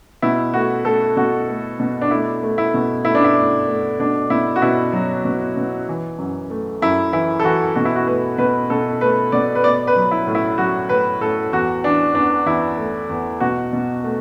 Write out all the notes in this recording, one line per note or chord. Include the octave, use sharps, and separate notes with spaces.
B2 E4
A3 F#4
A3 A4
B2 F#4
A3
B2
D4
A3 E4
A3
E4
B2
A3 E4
D4
E4
A3
A3
B2 D4
B2 E4
F#4
B2 E4
F#3
B2
B2
E3
F#2
A3
F#2 E4
E3 E4
A4
E3 F#4
B2 F#4
E4
F#4
A3 B4
B2 B4
B2 A4
A3 B4
B2 D5
B4
B3 D5
B4
F#3
E4
A2
E4
F#3 F#4
A2 B4
A2 A4
E2 F#4
E3 D4
E2 D4
E2 E4
A3
E2
B2 F#4
B2
A3